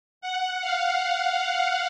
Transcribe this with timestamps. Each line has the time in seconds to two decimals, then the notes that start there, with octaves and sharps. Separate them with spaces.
0.21 F#5
0.61 F5